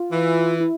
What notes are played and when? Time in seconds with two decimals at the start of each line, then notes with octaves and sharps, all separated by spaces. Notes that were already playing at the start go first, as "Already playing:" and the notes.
Already playing: F4
0.11 E3
0.60 E4